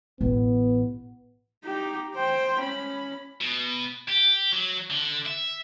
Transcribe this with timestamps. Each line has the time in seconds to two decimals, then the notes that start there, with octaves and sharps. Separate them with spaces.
0.21 A1 B3
1.64 D#4 G4
2.15 C5 G5
2.60 C#4 B5
3.41 B2
4.09 G4
4.52 F#3
4.91 D3
5.26 E5